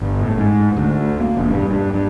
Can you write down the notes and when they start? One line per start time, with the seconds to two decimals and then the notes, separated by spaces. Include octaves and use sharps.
0.01 G1
0.22 A2
0.38 G#2
0.77 D2
1.21 A#3
1.37 E1
1.50 G2
1.71 G2
1.93 G2